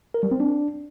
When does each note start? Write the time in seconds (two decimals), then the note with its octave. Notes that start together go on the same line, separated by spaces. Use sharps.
0.14 A#4
0.23 G3
0.32 C4
0.40 D4